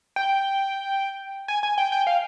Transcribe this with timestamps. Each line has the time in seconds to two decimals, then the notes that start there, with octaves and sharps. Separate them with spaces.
0.16 G5
1.48 G#5
1.63 G#5
1.78 G5
1.92 G5
2.07 F5